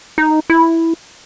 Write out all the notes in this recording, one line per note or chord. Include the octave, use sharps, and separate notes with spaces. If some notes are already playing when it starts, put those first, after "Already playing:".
D#4
E4